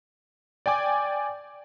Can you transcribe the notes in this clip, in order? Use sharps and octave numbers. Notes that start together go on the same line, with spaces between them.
D5 G5 G#5 D6